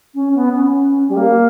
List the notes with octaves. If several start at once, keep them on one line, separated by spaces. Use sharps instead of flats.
C#4
B3
C#4
G3
A#3